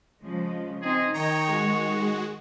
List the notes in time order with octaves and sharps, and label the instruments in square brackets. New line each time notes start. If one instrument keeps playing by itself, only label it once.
[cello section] C#3 F3 G#3
[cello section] C4 D#4 C5 [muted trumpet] G#4
[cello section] D#3 [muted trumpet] C#5 [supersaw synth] D#5 G5 A#5
[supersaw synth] G#3 F#4